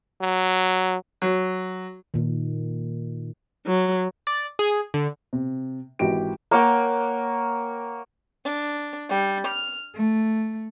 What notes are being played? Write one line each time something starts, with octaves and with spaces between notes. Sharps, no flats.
F#3
F#3
A#2 D#3
F#3
D5
G#4
D3
C3
G#1 E3 F#4 G4 D7
A#3 C#5 F#5 G5
D4
G3
F6
A3